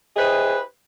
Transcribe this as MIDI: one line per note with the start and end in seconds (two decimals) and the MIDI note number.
0.17 0.59 64
0.17 0.59 67
0.17 0.59 68
0.17 0.59 71
0.17 0.59 72
0.17 0.59 75